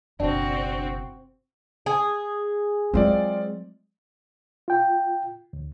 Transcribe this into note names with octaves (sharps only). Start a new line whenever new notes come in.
F#1 B2 C4 D4 F#4
G#4
F#3 G#3 C4 F4 D5
F4 G5
D2